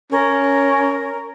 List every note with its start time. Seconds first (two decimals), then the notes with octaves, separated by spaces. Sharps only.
0.12 C#4 A#4